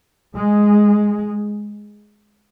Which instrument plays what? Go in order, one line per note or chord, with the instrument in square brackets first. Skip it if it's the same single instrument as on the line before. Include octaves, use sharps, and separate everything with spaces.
[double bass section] G#3